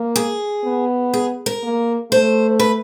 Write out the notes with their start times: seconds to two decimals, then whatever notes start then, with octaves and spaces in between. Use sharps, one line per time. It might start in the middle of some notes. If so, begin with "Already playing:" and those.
Already playing: A#3
0.16 G#4
0.64 B3
1.14 G#4
1.46 A#4
1.63 A#3
2.11 A3 C5
2.60 B4